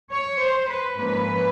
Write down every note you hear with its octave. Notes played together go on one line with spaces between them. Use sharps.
C#5
C5
B4
G#2 F3 A#3 C#4 B4